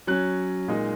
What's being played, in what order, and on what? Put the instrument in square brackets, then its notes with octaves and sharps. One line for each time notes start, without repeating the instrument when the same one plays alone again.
[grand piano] F#3 C#4 F#6
A#2 G#3 D#4